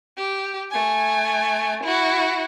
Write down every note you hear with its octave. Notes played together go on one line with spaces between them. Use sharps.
G4
A3 G#5
E4 F#4